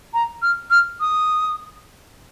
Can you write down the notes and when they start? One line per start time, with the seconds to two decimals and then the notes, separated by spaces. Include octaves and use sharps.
0.14 A#5
0.42 F6
0.70 F6
1.00 D#6